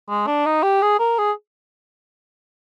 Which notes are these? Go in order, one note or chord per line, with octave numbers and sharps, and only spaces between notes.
G#3
D4
D#4
G4
G#4
A#4
G#4